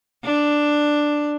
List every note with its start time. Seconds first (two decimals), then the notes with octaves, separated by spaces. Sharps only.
0.25 D4